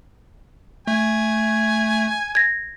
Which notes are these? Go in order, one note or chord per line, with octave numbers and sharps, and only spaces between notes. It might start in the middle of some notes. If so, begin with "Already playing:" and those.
A3 G#5
G#6 A#6